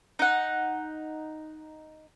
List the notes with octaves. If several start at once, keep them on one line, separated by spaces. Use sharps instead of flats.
D#4 F#5